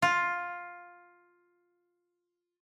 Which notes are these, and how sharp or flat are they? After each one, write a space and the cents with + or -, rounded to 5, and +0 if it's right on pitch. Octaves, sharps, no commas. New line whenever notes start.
F4 +10